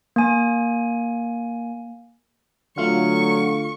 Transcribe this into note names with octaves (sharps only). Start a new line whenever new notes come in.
A#3 G#5
D3 F#3 A3 F4 F5 C#6